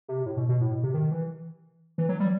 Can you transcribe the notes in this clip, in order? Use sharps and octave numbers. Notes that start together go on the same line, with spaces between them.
C3
A2
B2
B2
A2
B2
C3
D#3
E3
E3
F#3
G3